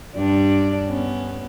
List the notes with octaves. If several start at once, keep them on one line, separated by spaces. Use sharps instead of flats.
G2 D4 D5
B3 C#4